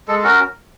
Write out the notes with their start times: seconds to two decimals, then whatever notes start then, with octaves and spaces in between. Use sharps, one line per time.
0.08 G#3 A4
0.19 A4
0.24 C#4 F#4 A#4